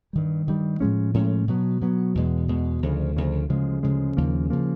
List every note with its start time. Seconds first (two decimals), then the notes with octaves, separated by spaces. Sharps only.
0.13 G2 D#3 G3
0.47 G2 D#3 G3
0.80 A2 F3 G#3 C#4
1.14 A2 F3 G#3 C#4
1.48 B2 F#3 B3
1.81 B2 F#3 B3
2.15 E2 B2 G#3
2.48 E2 B2 G#3
2.82 D2 C#3 F3
3.16 D2 C#3 F3
3.49 D2 C#3 F3 G#3
3.83 D2 C#3 F3 G#3
4.17 D#2 C#3 F3 A#3
4.50 C#3 F3 A#3